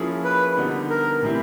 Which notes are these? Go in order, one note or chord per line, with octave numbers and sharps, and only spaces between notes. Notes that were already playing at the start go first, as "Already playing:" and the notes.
Already playing: F3 A#3 C#4 E4 G#4
B4
D3 G3 B3 D#4
A#4
A2 E3 G3 C4 E4